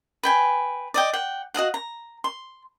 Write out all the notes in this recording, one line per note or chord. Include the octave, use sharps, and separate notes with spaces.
B4 G5 G#5
D5 D#5 G5
F#5 G5
F#4 D#5 F5 F#5
A#5
C6